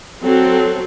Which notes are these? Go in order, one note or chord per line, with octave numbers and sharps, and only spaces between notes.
F#3 C4 A4